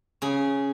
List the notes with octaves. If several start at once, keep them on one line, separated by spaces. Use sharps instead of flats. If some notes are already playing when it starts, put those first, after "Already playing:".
C#3 G#4